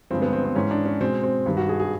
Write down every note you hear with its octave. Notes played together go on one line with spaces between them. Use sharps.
G2 D3 F3 G#3 C4
B3
C4
C4
G#2 E3 G#3 C#4
D4
C#4
B2 G#3 C4
C4
G2 D#3 G3
F#4
G#4
G#4